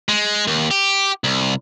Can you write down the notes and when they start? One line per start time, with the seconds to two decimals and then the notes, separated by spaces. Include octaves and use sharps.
0.09 G#3
0.47 D#2
0.71 G4
1.24 C2